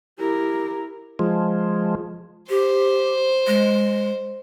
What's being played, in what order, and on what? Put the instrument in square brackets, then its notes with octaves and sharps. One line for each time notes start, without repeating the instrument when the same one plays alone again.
[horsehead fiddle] E4 A#4 [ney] G4
[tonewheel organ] F3 G#3
[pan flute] G4 [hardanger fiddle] C5
[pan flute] G#3